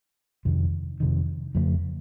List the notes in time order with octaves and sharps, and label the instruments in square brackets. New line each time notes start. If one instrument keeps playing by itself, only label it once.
[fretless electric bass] F2 C3 D#3
F2 C3 D#3
F2 C#3 F3 A3